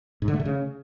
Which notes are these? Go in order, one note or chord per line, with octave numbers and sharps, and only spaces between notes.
G#2
D3
A3
D3
C#3